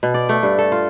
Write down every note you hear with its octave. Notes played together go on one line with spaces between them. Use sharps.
B2
D5
A3
G2
A4
F4